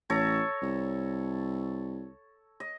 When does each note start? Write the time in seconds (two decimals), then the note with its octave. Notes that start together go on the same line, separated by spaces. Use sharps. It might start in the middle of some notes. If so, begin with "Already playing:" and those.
0.10 A1 A4 C#5 A#5
0.62 C2
2.60 D#5